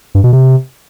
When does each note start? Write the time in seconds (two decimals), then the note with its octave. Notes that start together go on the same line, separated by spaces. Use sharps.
0.15 G2
0.24 B2
0.33 C3